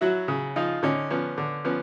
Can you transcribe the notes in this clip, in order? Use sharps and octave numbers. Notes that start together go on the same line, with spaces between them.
F#3 E4 F#4
C#3
F3 D#4 F4
D3 C#4 D#4
F3 B3 C#4
D3
F3 B3 C#4